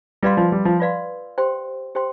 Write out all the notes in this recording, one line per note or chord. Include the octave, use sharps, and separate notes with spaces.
G3 F4 B4 D5 F5 C6
F3
G3
F3
F4 B4 D5 F5 C6
G4 C5 G5 C6
G4 C5 G5 C6